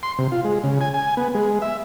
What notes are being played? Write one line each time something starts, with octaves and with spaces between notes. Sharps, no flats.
C6
C3
F4
G#3
C#3
G#5
G#5
B3
G#3
E5